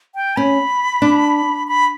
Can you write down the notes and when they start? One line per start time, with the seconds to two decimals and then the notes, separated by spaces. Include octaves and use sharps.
0.15 G5
0.36 C#4 B5
1.02 D4
1.68 B5